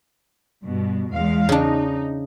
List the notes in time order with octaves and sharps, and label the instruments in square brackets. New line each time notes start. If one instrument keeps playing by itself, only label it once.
[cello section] G2 B2
E2 G#3 F5
[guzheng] C#3 D4 [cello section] D#4